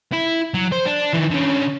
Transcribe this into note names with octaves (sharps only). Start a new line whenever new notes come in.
E4
F#3
C5
D4
D#3 E3
D3 C#4